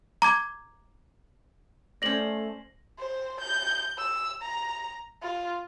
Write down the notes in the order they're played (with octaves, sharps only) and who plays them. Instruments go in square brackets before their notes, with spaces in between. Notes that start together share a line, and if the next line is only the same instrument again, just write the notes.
[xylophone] A#5 D6 G#6
[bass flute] A3 [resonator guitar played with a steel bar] C#4 C5 D5 [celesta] A#6 F#7
[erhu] C5
G6
E6
A#5
F4